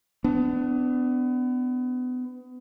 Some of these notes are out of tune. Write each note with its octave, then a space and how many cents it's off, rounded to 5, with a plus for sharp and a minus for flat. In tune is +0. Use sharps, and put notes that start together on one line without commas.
B3 +30 D4 -5